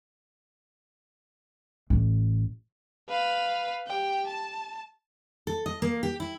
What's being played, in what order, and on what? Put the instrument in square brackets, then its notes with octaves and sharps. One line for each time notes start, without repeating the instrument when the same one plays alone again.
[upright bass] A1
[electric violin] B4 F5
G4 G5
A5
[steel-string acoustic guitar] A4
D#5
A#3
G4
E4